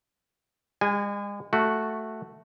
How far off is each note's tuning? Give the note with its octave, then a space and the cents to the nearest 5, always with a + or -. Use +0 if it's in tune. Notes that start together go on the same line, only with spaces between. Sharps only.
G#3 -40 G#5 -10
A3 +0 F#4 +0